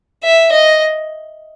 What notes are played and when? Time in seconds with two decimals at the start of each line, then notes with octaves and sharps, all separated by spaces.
0.24 E5
0.52 D#5